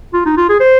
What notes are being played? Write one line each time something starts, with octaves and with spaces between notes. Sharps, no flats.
F4
D#4
F4
G#4
C5